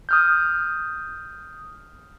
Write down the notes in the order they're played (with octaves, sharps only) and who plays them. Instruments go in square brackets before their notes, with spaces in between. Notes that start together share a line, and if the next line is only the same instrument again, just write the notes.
[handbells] D#6 F6 G6